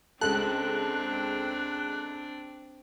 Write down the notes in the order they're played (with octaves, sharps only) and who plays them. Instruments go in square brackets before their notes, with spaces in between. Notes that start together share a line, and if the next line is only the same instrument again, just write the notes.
[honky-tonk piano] C#2 G#3 A4 [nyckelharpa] C4 D4 [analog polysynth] F#6